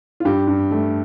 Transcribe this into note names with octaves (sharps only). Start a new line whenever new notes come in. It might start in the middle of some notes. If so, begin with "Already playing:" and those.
F4
G2 G4
G2
A3